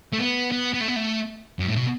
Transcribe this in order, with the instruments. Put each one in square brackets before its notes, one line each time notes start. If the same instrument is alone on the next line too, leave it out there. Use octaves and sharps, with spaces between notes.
[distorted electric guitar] A3
B3
B3
B3
A3
B3
A3
F#2
A2
B2